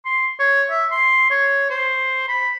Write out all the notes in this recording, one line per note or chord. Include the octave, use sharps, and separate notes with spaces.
C6
C#5
E5
C6
C#5
C5
B5